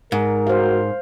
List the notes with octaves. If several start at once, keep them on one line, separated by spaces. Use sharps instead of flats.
G#2 A#4
F#4 C5 F5